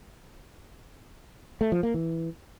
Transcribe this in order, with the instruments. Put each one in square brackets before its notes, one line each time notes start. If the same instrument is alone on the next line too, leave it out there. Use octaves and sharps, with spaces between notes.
[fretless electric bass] A3
F3
A#3
E3